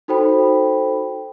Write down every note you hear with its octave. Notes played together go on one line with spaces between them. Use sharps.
D#4 F#4 A4 C5 G5 B5